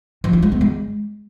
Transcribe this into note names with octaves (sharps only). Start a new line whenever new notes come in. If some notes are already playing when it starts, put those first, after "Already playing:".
F3
F4
G#3
B3
G#3